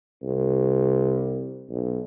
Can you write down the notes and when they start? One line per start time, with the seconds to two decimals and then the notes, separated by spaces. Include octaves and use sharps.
0.23 C2
1.70 B1